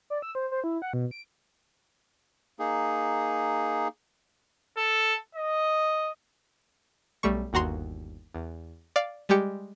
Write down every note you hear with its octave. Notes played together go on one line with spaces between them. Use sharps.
D5
E6
C5
C5
E4
F#5
B2
D7
A#3 D#4 G#4
A4
D#5
B1 G3 A3 C#6
G1 D#2 F#4 A#5 C6
E2
D5 F5
G3 G#3 G4 C#7